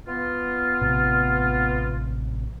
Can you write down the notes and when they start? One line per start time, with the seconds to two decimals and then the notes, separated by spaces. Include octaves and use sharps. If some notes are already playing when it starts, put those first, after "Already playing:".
0.07 B3 F4
0.82 A1 C3